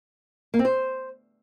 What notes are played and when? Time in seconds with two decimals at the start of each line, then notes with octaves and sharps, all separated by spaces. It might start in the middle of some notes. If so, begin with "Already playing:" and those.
0.54 A#3
0.59 C4
0.65 C5